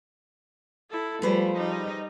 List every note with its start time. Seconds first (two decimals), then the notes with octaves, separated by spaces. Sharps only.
0.90 E4 A4
1.22 F3 G3 A3 G#4 B4 C5
1.57 G3 D#4